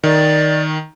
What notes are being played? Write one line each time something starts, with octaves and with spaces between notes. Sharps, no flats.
D#3 D5